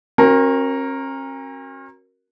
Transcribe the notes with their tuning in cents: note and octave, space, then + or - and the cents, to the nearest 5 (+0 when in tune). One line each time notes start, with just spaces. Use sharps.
C#4 -45 F#4 +0 A#4 +0